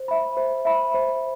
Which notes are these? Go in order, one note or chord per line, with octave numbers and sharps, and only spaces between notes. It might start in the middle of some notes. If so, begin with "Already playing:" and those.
Already playing: C5
E5 B5
C5
E5 B5
C5